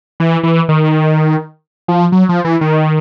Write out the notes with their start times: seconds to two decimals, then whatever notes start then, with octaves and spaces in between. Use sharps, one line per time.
0.20 E3
0.43 E3
0.69 D#3
1.88 F3
2.12 F#3
2.29 F3
2.45 E3
2.61 D#3